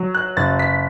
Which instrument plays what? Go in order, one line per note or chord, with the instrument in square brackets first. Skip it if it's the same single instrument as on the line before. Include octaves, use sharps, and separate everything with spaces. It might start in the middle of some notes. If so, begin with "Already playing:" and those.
Already playing: [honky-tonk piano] F#3
F#6
F#1 A6
B6